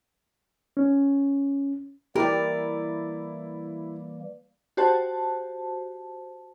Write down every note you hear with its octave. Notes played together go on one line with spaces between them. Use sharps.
C#4
E3 G3 A#3 E4 G4 A#4 D5
F#4 G4 C5 A5